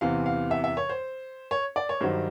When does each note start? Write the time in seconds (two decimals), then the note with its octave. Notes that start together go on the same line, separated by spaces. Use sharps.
0.01 E2 C3 E3 F5
0.26 F5
0.51 E5
0.64 E5
0.77 C#5
0.89 C5
1.51 C#5
1.76 D5
1.89 C#5
2.01 G2 D#3 F#3 C5